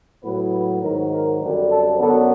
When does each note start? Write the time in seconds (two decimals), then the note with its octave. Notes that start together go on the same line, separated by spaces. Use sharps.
0.22 A2 F#3 B3 B4
0.52 B4
0.81 G#2 D#3 F#3 A#4
1.10 A#4
1.39 F#2 D3 G3 C4
1.69 A4
1.98 F#2 D3 F#3 B3 A4